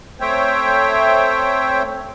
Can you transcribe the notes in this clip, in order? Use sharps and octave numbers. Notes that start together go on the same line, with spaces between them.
A3 C4 C5 C#5 E5 G5